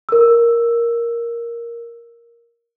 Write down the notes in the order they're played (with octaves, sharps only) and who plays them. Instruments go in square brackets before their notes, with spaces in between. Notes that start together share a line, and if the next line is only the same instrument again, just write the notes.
[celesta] A#4 E6